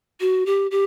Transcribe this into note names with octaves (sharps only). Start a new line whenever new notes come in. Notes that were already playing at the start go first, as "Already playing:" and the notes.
F#4
G4
G4